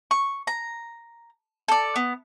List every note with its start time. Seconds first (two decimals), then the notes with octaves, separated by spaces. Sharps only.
0.11 C#6
0.47 A#5
1.68 A4 D5
1.96 B3